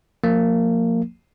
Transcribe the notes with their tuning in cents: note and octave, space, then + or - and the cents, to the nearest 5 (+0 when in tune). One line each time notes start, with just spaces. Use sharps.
F3 +25 A#3 -20